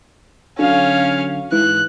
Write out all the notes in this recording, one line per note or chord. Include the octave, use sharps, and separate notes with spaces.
D3 F#3 C#4 F5
G#2 E3 F#6